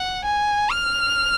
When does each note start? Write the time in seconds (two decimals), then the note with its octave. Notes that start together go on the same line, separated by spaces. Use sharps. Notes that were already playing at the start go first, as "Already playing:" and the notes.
Already playing: F#5
0.25 G#5
0.71 F6